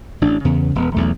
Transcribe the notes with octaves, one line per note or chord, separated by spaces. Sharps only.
A1 D4
E2 C#3 B3
E1 B3
B1 E2 A3